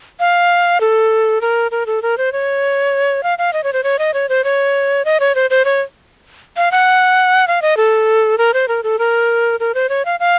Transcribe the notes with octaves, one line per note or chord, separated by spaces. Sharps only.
F5
A4
A#4
A#4
A4
A#4
C5
C#5
F5
F5
D#5
C#5
C5
C#5
D#5
C#5
C5
C#5
D#5
C#5
C5
C5
C#5
F5
F#5
F5
D#5
A4
A#4
C5
A#4
A4
A#4
A#4
C5
C#5
F5
F5